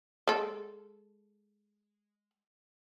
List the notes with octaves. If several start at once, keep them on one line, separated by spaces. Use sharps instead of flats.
G#3 A4